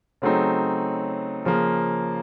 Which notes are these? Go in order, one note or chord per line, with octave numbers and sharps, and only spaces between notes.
C#3 F#3 A3 C4 D#4
C#3 F3 A#3